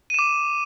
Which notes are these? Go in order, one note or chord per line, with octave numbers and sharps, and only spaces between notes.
D6 D#7 E7